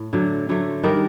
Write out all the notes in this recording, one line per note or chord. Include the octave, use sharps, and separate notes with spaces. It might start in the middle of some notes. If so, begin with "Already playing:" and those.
Already playing: A2
D3 F#3 A3
D3 F#3 A3
D#3 G3 D4 A#4